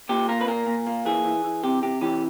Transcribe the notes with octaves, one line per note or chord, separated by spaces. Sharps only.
A#2 G4
A#3 A#4
B4
A#2 A#4
A#2
A#3
E3 G#4
E3
E3
C3 G4
C3 G4
E3 G4